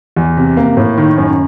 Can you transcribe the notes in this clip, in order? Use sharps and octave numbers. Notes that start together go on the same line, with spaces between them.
E2
C3
A#3
A2
D#3
F#2